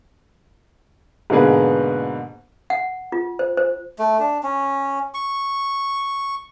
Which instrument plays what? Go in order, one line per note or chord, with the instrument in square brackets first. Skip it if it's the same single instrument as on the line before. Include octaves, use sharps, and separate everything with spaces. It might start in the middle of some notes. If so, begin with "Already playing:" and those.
[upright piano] G#2 B2 D3 A#3 G#4 B4
[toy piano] F#5
F4
C5
C5
[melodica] A3
D4
C#4
C#6